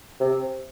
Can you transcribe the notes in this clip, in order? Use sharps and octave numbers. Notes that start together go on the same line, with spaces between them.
C3